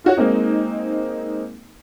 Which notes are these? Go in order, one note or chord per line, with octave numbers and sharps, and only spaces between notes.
F4 F#4 C#5
G#3 A#3 C4 D#4